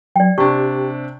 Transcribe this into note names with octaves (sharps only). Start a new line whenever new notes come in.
F#3 D5 G5
C3 D4 G4 G5 C#6